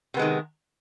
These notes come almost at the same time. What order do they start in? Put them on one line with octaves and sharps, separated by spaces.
C3 B3 G#3 D#3